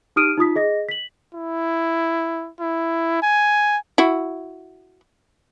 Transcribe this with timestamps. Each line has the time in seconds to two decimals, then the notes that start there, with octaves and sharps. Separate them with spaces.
0.16 D#4 G4 D#6 F6 D7 D#7
0.37 D#4 F4 D#6 B6
0.56 G#4 D#5 A#6
0.89 B6 F#7
1.35 E4
2.61 E4
3.23 G#5
3.98 E4 F#4